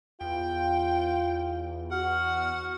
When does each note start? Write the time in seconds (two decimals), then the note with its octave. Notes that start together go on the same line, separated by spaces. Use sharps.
0.21 E2 F4 G5
1.91 F#4 F#5 F6